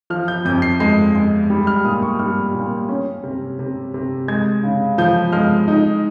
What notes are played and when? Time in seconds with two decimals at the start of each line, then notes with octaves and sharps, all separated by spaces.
0.10 F3 F6
0.28 G6
0.45 F2 G6
0.62 C7
0.80 G#3 C7
1.15 G#3
1.50 G3
1.67 F6
1.84 A#2 D#6
2.03 C#6
2.19 G3 F6
2.54 A#2
2.89 C#4
3.24 C3
3.59 C3
3.94 C3
4.28 G#3 G#6
4.63 C#3
4.98 F3 G6
5.33 G#3 F6
5.68 D#4